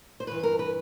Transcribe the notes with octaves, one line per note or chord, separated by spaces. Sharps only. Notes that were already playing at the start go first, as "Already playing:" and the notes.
C5
G2 E3 B4
A#4
B4